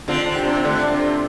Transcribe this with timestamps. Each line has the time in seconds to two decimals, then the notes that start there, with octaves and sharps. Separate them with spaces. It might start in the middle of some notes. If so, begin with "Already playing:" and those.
0.08 D3 C4 F4
0.26 D3
0.36 D4 G4
0.45 C3
0.57 C4
0.63 D3 A3 D4
0.92 C3